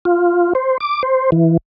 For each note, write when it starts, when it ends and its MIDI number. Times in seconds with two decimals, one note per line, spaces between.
0.05 0.53 65
0.55 0.78 72
0.80 1.02 86
1.03 1.30 72
1.32 1.57 52